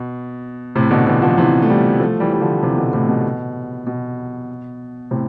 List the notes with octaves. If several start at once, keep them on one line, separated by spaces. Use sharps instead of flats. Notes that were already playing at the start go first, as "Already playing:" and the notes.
Already playing: B2
A2 C3
B2 D3
C3 E3
D3 F3
C3 E3
A3
E3 G3
F3 A3
E3 G3
G3
D3 F3
C3 E3
B2 D3
A2 C3
B2
B2
A2 C3